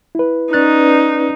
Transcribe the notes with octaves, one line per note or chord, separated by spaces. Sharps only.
E4 B4
C#4 D#4 B4 D5 F#6 A6